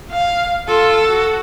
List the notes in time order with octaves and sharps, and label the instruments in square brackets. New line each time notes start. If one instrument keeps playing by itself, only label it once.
[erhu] F5
[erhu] F4 [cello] A4
[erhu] F#4